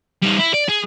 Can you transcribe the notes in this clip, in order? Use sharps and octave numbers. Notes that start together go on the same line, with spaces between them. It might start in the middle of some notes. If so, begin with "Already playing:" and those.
G3 D#4
E4
D5
G#4